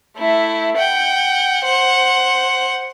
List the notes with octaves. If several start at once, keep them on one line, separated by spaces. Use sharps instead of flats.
A3 E4
F#5 G5
C5 F#5